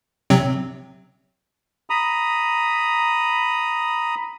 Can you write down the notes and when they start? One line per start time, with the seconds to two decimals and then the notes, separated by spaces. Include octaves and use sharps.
0.30 C3 F#3 C4
1.90 A#5 B5 D#6